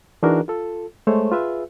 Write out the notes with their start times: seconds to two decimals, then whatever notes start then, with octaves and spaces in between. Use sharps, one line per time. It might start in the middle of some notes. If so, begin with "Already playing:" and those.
0.23 E3 D4 D#4 F#4 G#4 A#4
0.48 F4 A4
1.07 G#3 A3 C5 C#5
1.32 F4 G#4 B4 E5